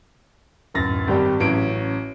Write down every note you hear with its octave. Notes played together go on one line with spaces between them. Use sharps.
D1 F#2 A6 A#6
G#1 G3 G4
A1 F#3 C#4 D7